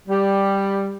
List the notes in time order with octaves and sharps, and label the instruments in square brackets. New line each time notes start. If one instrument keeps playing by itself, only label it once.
[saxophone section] G3